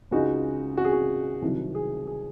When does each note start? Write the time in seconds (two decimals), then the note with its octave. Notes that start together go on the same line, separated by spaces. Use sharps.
0.11 C#2 C#3 G#3 D#4 F#4
0.77 F#4
0.85 G#4
0.93 F#4
1.42 C2 C3 D#3 F#3
1.75 G#4
2.07 G#4